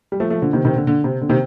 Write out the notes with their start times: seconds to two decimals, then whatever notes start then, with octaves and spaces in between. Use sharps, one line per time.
0.12 G3
0.20 F3 A3
0.30 F3 A3
0.42 D3 F3
0.53 C3 D#3
0.65 C3 D#3
0.77 D3
0.87 D3
1.04 C3
1.21 D3
1.29 C3 D#3